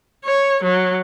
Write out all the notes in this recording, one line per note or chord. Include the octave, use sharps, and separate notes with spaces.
C#5
F#3